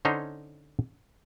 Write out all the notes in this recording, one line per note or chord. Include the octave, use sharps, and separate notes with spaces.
D3 C#4 D#4 C5 C#5